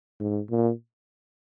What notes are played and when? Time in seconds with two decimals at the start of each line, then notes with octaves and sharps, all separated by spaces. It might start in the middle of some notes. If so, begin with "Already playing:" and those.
0.20 G#2
0.50 A#2